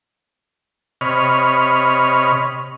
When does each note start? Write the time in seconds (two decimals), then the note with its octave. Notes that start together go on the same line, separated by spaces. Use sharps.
1.01 C3 C#5 D#5 B5 C#6 F6